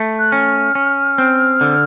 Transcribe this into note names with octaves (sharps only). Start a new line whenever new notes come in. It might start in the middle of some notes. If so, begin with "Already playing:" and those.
Already playing: A3
F#6
C#4 F6
C#4
C4
D3